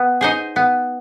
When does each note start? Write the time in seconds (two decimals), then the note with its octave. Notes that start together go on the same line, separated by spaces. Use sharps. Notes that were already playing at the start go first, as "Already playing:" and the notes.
Already playing: B3
0.21 D#4 G#4 C5 D#5
0.56 B3